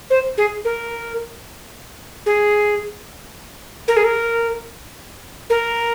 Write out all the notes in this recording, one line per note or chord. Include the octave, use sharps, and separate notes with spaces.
C5
G#4
A#4
G#4
A#4
G#4
A#4
A#4